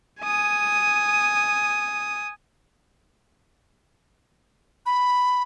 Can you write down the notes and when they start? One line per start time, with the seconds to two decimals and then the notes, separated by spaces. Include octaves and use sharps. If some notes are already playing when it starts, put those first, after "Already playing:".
0.21 G#5 D#6
4.86 B5